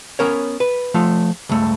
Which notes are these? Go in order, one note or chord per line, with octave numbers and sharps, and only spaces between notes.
B3 C#4 A#4 C#5
B4
F3 A3 F4
C#2 G2 A3